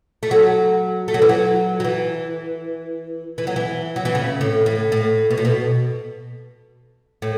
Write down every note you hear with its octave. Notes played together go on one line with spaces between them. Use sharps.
A3
F#3
A3
F#3
E3
F#3
F#3
E3
E3
F#3
E3
F#3
E3
C#3
A2
A2
A2
B2
A2
B2
A2